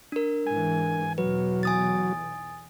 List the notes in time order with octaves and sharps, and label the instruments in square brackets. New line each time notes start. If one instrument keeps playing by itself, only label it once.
[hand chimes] D4 A#4
[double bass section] G#2 E3 [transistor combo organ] G#5
[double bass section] B1 E2 B2 [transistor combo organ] F#3 [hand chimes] B4
[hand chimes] G#5 D#6 A6